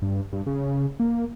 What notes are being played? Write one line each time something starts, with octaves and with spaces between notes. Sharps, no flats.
G2
G2
C#3
A#3